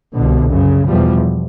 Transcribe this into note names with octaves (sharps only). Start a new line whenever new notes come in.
C2 B2 D3
F#2 C#3
E2 B2 F3 G3